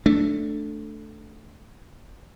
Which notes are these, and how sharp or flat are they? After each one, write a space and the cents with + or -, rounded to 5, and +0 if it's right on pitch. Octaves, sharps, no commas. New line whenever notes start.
A3 +0 D4 +0